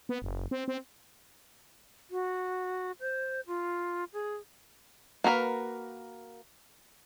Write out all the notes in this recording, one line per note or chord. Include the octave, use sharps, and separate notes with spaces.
B3
F#1
C4
C4
F#4
C5
F4
G#4
A#3 F#4 A#4 B4